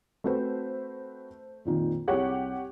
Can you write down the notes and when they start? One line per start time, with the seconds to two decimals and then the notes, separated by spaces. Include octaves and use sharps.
0.24 A3 C4 F#4 B4 C5
1.65 F2 A#2 D#3
2.08 C2 G4 G#4 C#5 F#5